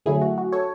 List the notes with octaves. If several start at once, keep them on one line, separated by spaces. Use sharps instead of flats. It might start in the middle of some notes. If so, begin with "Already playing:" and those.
F#2 D3 F#3 A3 E4 G#4
F#4
F#4
A4 C#5